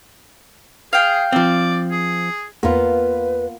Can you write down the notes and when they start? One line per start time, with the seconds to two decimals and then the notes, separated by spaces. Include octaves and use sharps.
0.93 G#4 F5 G5
1.32 F3 C4 D5
1.91 G#4
2.63 E2 A#3 B3 F4 B4